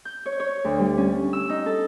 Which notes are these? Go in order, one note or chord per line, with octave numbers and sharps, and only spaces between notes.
G6
C#5
C#5
D2
G3
C#4
E6
D#4
A4